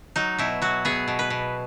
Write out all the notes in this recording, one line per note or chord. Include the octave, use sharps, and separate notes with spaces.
F#3 D#4
B2 E4
F#3 F#4
B3 G#4
B2
B4
B2